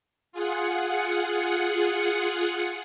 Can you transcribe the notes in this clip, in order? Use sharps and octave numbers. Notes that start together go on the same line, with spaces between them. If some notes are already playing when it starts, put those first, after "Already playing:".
F4 G#4 F#5 C#7